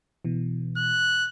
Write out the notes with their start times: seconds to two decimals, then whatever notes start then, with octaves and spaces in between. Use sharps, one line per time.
0.25 B2 E3
0.77 F#6